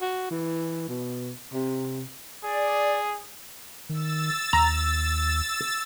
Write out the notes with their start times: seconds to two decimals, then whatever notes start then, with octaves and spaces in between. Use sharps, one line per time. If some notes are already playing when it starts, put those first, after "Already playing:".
0.01 F#4
0.31 E3
0.88 B2
1.53 C3
2.44 G#4 D5
3.89 D#3 E6 A6
4.53 D#2 A#5